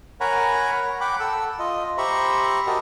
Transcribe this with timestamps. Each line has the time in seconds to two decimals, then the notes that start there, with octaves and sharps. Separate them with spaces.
0.21 A#4 C#5 F#5 G#5 A#5 B5
1.01 F#5 G5 B5 D6
1.20 A4 E6
1.59 F4 D#5
1.98 G4 C5 E5 A#5 B5 C#6
2.67 F#4 G4 A#4 D#5 A5